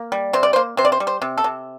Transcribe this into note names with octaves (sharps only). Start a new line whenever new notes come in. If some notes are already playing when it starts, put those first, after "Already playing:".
Already playing: A#3
G3
C3 C5
D5
C5
A#3
C3 C5
D5
C5
G3
C5
C3
A4
C3